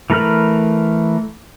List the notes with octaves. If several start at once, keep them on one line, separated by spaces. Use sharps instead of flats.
E3 A3 A#4 B5 F6